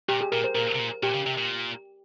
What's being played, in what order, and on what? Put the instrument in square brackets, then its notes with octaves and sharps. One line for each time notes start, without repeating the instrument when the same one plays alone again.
[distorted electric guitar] A#2 [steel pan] G4
[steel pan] G#4
[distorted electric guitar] A#2 [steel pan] A#4
[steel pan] C5
[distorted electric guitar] A#2 [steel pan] A#4
[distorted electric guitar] C3
A#2
[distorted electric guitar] A#2 [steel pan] G4
[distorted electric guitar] C#3
C3
A#2